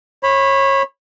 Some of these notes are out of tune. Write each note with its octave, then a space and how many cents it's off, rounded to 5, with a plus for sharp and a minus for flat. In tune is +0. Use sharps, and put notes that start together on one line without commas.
C#5 -25 B5 +5